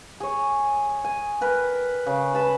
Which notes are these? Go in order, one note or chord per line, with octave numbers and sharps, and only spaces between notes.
G#4 C#5
G#5
A#4 B4 G5
C#3
B4 A5 B5